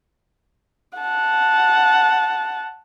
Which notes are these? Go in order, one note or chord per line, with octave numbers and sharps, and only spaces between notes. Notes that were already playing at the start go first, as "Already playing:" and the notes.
F#5 A5